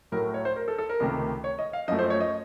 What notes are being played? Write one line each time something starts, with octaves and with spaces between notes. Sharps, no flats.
A2 F#3 A3 A#4
C#5
C5
A#4
A4
A4
A#4
C#2 C3 D#3 A3
C#5
D#5
F5
F#2 F3 A3 D#5
C5
C#5
D#5